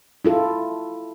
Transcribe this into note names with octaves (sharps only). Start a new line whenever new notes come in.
E4 F4 A4